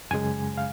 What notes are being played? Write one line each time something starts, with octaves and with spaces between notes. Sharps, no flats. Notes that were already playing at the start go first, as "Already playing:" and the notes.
F#2 C#3 G#3 G#5
F5